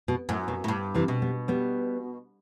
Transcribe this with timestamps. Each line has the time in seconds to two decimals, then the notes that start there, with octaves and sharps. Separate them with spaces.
0.08 B2
0.29 F#2 A2
0.48 B2
0.64 A2
0.68 G2
0.95 C3 E3
1.08 B2
1.22 G3 B3
1.48 G3 B3